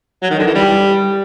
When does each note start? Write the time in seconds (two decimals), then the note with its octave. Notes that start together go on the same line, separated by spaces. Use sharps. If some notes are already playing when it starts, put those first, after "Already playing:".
0.22 F#3
0.31 D#3
0.39 D3
0.47 E3
0.55 G3